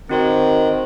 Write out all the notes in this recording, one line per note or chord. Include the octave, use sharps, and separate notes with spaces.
D#3 C4 F#4 C5